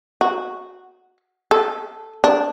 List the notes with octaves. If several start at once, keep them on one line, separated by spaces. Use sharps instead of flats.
F#4
A4
D4